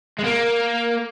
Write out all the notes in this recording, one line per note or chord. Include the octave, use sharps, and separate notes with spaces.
G#3
A#3